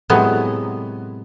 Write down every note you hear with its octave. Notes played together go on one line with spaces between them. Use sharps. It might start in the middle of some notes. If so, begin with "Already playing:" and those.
A2 C3 F#3 G#3 B3